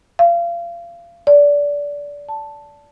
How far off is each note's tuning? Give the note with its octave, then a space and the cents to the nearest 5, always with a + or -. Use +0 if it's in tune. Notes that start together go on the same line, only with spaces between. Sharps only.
F5 -30
D5 -20
A5 +0